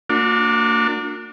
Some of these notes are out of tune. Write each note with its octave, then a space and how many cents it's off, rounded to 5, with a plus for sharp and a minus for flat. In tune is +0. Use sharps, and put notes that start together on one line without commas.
A#3 -30 D4 +0 F#4 -45